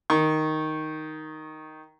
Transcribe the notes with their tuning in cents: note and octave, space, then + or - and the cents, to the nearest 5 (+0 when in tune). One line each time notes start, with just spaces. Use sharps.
D#3 +0 C#6 -20